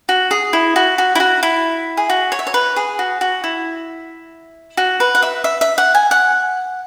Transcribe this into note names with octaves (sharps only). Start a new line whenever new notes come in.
F#4
G#4
E4
F#4
F#4
E4
F#4
E4
G#4
F#4
C#5
E5
C#5
B4
G#4
F#4
F#4
E4
F#4
B4
F#5
E5
E5
E5
F#5
G#5
F#5